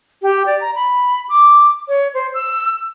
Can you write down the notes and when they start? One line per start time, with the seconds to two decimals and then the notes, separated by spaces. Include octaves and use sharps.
0.22 G4
0.46 D5
0.61 A#5
0.75 B5
1.29 D6
1.88 C#5
2.14 C5
2.34 E6